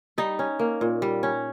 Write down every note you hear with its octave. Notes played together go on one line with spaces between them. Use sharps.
G3 D#4
C#4
A#3
A#2
G3
C#4